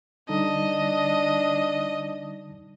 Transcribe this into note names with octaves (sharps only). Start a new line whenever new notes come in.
D3 G3 D4 D#4 D#5